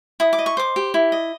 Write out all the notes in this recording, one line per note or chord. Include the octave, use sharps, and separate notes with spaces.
E4 D#6
D6
D#5
C#6
C5 D6
G4
E4
D#5